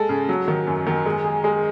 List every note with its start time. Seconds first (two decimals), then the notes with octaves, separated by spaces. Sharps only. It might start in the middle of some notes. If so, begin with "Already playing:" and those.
Already playing: G#3 A4
0.09 C#3
0.29 F#3
0.48 D#3
0.67 F#2
0.87 D#3
1.06 G#3
1.25 G#4
1.44 G#3